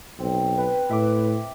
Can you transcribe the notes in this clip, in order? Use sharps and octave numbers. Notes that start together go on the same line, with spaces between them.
B1 C4
B4 G5
A2 E5 D6